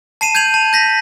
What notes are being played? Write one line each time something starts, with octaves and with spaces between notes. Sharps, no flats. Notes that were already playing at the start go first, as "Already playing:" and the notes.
A5 C7 D#7 E7
G6 G#6 D#7 F7 F#7
A5
G6 A#6 B6